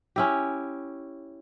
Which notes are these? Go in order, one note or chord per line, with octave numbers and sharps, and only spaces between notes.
C#4 E4 G4